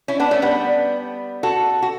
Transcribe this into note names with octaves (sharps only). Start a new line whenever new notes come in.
C#4 E4
B3 D4
A3 C#4
G3 B3
F#4 A4
F#4